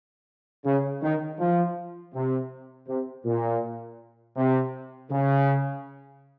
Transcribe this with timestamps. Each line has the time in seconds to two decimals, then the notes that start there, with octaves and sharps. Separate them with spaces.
0.65 C#3
1.02 D#3
1.39 F3
2.14 C3
2.88 C3
3.25 A#2
4.37 C3
5.11 C#3